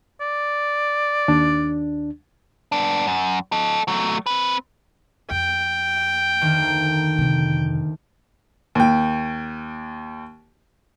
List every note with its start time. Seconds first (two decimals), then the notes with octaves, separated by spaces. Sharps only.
0.21 D5
1.28 D#2 D4
2.72 B3 D4
3.07 F#2
3.52 A4 D#5
3.88 F#3 A3
4.26 C4 B4
5.31 F2 G5
6.41 D2 D#3 A#3
7.18 F2 C3
8.75 D#2 G5